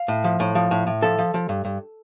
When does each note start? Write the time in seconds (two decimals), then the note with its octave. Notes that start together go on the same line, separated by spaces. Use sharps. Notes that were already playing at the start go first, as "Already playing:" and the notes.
Already playing: F5
0.08 A2
0.24 F3
0.40 A2
0.55 F3
0.71 A2
0.87 A2
1.02 F3 A4
1.19 F3
1.34 F3
1.49 G2
1.65 G2